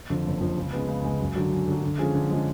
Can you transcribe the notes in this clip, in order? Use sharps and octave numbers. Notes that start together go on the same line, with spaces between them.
F2 D3 F3
F#1
F2 D3 F3
C#2
C#3 G#3 B3
C#2
C#3 G#3 B3
F#2
D3 F#3
F#2
D3 F#3
D3
F3 G#3 C#4 G#4
D3
F3 G#3 C#4 G#4